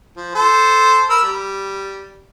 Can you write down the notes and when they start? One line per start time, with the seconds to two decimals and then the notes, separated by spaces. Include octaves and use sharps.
0.17 F3
0.35 A4 C5
1.10 A#4 B5 E6
1.23 G3